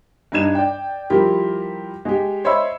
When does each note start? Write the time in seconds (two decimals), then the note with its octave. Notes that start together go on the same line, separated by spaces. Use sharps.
0.32 G2 D4 D#4 G#6 E7
0.55 D5 G5
1.10 F3 G3 E4 F4 G4 A#4
2.05 G#3 G4
2.44 C5 C#5 D#5 E5 B5 E6